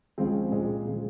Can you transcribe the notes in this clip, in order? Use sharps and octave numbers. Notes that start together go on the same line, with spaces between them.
C#2 C#3 F3 G#3 C4
A#2 G#3 C4
C#3 F3 G#3